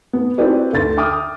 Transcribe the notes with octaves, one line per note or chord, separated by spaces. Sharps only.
B3
C4 E4 F#4 G4 B4 D5
D2 A6
E5 G5 D6 D#6 F6